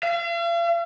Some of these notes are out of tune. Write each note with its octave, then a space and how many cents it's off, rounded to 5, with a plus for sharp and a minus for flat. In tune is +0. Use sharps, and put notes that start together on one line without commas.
F5 -45